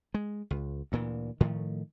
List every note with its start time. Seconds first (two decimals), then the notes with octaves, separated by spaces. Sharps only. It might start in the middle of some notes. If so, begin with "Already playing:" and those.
0.14 G#3
0.51 C#2
0.92 D2 A#2 E3
1.40 A2 D#3 F3 A3